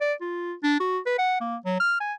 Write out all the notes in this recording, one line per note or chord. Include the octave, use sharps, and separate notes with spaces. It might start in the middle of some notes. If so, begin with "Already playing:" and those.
D5
F4
D4
F#4
B4
F#5
A#3
F#3
F6
G#5